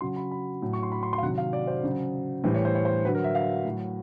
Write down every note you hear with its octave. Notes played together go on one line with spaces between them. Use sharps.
C#3 F#3 C6
B5
B5
A2 F#3
C#6
C6
B5
C6
C6
F5
C3 D#3 F#3 F#5
F5
D5
C5
C#3 F#3
A2 E3 G3 C5
C#5
C5
C#5
C5
D3 F#3 B4
A#4
E5
F5
A2
F#3